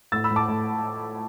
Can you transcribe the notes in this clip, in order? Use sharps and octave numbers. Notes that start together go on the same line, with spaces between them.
A2 E6 A6
B5 E6
A2
A5 D6
A2